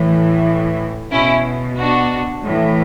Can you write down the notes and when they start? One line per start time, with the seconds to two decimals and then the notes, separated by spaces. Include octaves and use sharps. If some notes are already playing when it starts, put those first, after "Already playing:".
Already playing: A2 E3
1.11 B2 C#4 E4
1.77 D4 F#4
2.44 A2 E3